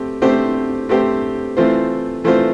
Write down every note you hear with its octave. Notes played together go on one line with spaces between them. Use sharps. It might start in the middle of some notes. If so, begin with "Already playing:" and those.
Already playing: A3 C4 G4
A3 C4 G4 C5
A3 C4 G4 C5
E3 A3 C4 F4 C5
E3 A3 C4 F4 C5